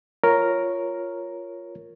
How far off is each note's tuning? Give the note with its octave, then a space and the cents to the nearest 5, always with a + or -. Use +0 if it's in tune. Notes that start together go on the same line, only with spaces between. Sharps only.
F4 +0 A#4 +0 C#5 +0